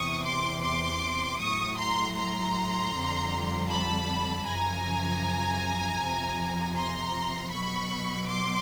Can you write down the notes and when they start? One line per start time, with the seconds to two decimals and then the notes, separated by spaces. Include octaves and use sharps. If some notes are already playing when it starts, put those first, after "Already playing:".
Already playing: E2 C3 E3 C#6 D#6
0.25 C6 D6
0.62 C6 D6
1.39 A2 F#3 C#6 D#6
1.77 A#5 C6
2.16 A#5 C6
2.92 F2 D3 G3
3.68 A5 B5
4.44 F#2 C#3 F3 G#5 A#5
5.98 F2 C3 F3
6.74 A#5 C6
7.51 B2 F#3 B5 C#6
8.28 C6 D6